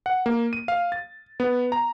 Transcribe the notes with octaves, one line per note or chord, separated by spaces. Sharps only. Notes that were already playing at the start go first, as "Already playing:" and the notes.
F#5
A#3
D#7
F5
A6
B3
A#5